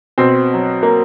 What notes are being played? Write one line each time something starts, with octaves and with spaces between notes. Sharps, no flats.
B2 C4
F#3
A#3